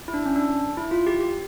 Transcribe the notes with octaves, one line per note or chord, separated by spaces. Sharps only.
E4
D4
C#4
D4
E4
F4
G4
G4